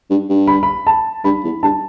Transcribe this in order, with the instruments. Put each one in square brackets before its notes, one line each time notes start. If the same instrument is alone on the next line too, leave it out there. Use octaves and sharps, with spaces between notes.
[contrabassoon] G2
G2
[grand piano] B5
B5
A5
[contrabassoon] G2 [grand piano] B5
[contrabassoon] E2
[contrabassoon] G2 [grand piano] A5